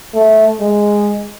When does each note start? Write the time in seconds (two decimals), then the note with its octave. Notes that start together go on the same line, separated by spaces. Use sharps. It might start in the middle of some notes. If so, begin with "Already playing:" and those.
0.14 A3
0.61 G#3